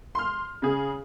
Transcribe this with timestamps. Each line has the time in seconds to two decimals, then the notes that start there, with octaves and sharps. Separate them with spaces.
0.15 C6 F6
0.62 C#3 G#4